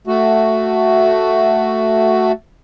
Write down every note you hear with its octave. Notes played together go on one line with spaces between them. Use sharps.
A3 F#4